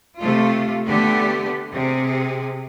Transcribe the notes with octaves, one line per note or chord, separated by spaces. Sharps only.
C3 A3 F4
D3 A3 B3 G4
C3 G#4